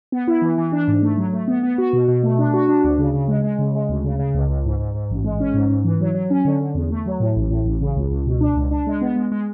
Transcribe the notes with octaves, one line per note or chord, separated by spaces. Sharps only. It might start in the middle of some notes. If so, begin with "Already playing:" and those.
B3
E4
E3
E3
D4
G#2
A3
F#3
A3
B3
B3
F#4
B2
B2
A3
D4
F#4
D4
D2
C#3
C#3
G#3
G#3
C#3
G#3
D2
C#3
C#3
C#2
C#2
G#2
G#2
G#2
A1
G#3
C#4
G#2
G#2
E3
F#3
F#3
C#4
D3
D3
E2
A3
F#3
A2
A1
A2
A1
C#3
C#2
C#2
B2
D4
C#2
D4
G#3
B3
G#3
G#3